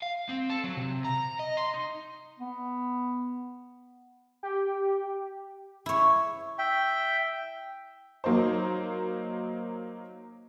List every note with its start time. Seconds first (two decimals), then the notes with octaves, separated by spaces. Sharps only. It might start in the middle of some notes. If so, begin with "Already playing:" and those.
0.02 F5
0.29 C4
0.50 A4
0.64 F#3
0.77 C3
1.04 A#5
1.40 D#5
1.57 C6
1.74 D#4
2.39 B3
4.43 G4
5.86 E4 C#5
6.59 E5 G5
8.24 F#3 A#3 D#4 C5